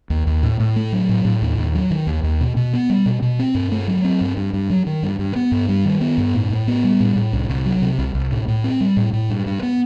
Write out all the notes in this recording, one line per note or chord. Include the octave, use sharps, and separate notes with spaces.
D#2
D#2
A2
A2
A3
F#3
A2
A2
D#2
D#2
F#3
D#3
D#2
D#2
B2
B2
B3
G3
B2
B2
C4
G2
A3
F#3
C4
G2
G2
G2
F#3
D#3
G2
G2
B3
G2
G3
D#3
B3
G2
A2
A2
B3
G3
A2
A2
C2
C2
F#3
C3
C2
C2
A2
A2
C4
G3
A2
A2
G2
G2
B3